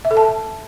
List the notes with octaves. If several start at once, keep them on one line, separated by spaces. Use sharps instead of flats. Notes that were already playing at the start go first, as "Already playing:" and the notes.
E5
A4
A5